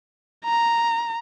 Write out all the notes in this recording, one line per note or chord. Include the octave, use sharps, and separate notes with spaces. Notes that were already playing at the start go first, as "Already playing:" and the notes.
A#5